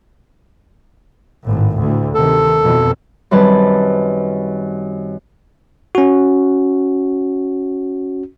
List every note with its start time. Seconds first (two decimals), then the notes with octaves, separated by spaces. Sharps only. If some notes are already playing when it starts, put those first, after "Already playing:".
1.45 G#1 A2
1.81 D2 A2
2.14 C3 D#3 A4
2.63 F2 B2 E3
3.31 F#2 D#3 G3 C4 B4 A5
5.95 C#4 F#4